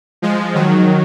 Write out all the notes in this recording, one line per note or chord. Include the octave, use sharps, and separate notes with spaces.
F3 G#3
D#3 F#3